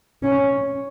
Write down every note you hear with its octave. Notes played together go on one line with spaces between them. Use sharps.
C#4